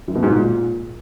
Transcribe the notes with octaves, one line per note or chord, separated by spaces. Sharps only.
F#2
B2
G#2
A#2